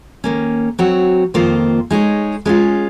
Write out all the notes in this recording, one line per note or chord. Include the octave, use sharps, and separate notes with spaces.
D#3 A#3 C#4
F#3 C4 F#4 C#5
F2 D#3 A#3 F4 C5
G#3 D#4 G#4 C#5
G#3 C#4 F4